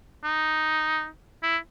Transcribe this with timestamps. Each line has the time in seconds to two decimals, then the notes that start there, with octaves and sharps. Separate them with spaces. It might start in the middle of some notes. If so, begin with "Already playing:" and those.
0.24 D#4
1.43 E4